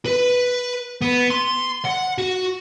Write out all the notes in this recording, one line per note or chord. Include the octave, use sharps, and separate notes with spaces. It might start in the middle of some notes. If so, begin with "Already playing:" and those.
B4
B3
C6
F#5
F#4